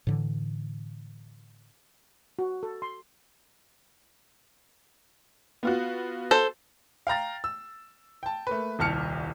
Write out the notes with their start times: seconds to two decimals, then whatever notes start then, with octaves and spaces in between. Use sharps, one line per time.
0.07 A2 D3 E3
2.39 F#4
2.63 A4
2.82 C6
5.63 B3 F4 F#4
6.31 A4 C5
7.07 F5 G5 A#5 A6
7.44 E6
8.23 G5 A5
8.47 A3 A#3 B4
8.79 D#1 C2 A5 F6 C#7